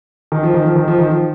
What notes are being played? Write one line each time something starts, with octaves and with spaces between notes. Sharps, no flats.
D#3
F3
D#3
F3
D#3
F3
D#3
F3